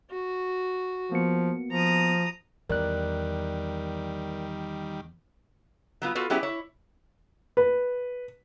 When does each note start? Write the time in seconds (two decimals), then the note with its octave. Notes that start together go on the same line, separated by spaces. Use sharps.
0.11 F#4
1.12 F3 A#3 B3 C#7
1.72 F3 A#5 D#6
2.70 E2 D#3 G3 A#4 D5 F#6
6.02 F#3 B3 F4
6.15 B3 F4 F#4 A4
6.30 F#3 B3 C#4 E4 G4 G#4
6.43 E4 C#5
7.57 B4